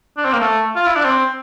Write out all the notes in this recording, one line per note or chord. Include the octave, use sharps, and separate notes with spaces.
D4
C4
A#3
A3
F4
E4
D4
C4